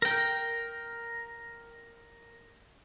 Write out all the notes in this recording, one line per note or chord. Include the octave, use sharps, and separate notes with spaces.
A#4 G5